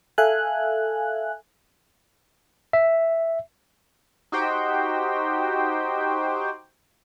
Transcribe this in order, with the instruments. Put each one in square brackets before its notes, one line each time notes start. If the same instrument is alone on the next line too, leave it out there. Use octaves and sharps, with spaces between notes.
[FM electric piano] A4 E5 F5 G#5 F#6
[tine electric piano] E5
[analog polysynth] D#4 F#4 G4 C5 G5